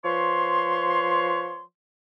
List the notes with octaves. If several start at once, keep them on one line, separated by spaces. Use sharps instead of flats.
F3 B4 C#5 C6